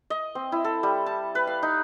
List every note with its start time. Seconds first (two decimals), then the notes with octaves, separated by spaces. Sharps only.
0.10 D#5
0.35 C4
0.52 E4
0.64 A4
0.83 G3
1.06 A5
1.35 B4
1.47 F5
1.63 D#4